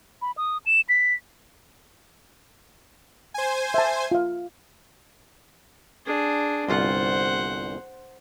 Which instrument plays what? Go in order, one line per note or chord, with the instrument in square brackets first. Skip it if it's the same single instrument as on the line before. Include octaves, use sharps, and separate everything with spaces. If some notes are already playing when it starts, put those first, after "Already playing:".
[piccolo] B5
D#6
E7
B6
[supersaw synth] C5 G#5
[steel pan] E5 A5
F4 F5
[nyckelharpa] D4 G#4
[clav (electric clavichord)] G1 C2 F4 [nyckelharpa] C5 F#5